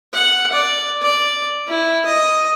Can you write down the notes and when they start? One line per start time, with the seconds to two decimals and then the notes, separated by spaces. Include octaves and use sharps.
0.13 F#5
0.52 D5
1.02 D5
1.68 E4
2.06 D#5